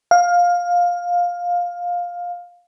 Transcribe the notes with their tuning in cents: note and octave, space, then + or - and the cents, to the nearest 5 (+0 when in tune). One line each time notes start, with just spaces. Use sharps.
F5 +15